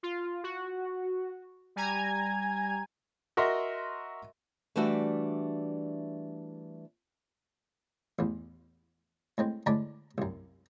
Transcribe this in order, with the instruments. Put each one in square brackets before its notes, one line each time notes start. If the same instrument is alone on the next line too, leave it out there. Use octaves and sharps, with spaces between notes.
[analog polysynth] F4
F#4
G3 G#5 A#5 G#6
[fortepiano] F#4 A#4 D#5 E5 C6
[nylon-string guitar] E3 G3 A3 D4 F#4 E5
[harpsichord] A1 E2
A2 G#3 C4
A2 D3 G#3 D4 A5 B5
C2 F#2